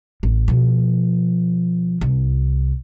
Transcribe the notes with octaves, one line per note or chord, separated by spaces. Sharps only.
A1
B2 F3
C2